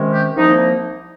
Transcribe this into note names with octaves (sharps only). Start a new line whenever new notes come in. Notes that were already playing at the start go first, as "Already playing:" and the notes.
Already playing: C3 D#3 G#3 C#4
G4
C2 C3 F3 A#3 D#4